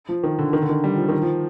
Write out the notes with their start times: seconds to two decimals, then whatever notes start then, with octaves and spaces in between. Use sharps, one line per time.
0.09 F3
0.23 D#3
0.39 D3
0.53 D#3
0.62 D3
0.69 D#3
0.84 G3
0.96 F3
1.09 D#3
1.22 F3